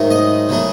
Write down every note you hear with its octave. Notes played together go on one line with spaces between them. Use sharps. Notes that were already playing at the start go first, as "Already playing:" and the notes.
Already playing: G#2 D#3 F#3 A3
D#5
C#3 F#3 A3